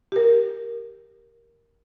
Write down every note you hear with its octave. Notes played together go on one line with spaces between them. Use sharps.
G4 A#4